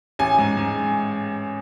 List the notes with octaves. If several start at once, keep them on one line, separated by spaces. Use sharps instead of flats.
A1 G#5
G#2
G#2